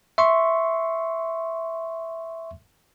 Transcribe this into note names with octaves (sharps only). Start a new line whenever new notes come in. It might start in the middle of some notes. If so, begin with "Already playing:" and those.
E5 C6 C#6